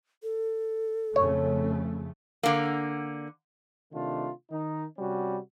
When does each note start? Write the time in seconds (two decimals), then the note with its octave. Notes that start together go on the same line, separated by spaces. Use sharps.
0.23 A4
1.16 F2 C#3 A3 C#5
2.43 D3 A#3
3.92 C3 D#3 A3 D4 F4
4.50 D#3 D#4
4.98 C3 G3 C#4 F#4